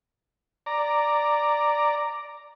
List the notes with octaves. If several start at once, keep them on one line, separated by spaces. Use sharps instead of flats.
D5 A#5